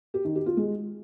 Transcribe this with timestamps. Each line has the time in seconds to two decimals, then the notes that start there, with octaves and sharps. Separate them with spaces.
0.14 G4
0.25 D#3
0.35 G4
0.46 F4
0.57 G#3